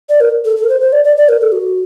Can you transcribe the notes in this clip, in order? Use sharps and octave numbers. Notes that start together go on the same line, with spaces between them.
D5
A#4
A4
A4
A#4
C5
C5
D5
D5
D5
A#4
A4
F#4